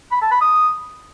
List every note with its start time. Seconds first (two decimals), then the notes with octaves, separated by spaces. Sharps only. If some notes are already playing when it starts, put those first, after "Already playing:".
0.11 B5
0.21 A5
0.31 B5
0.41 D#6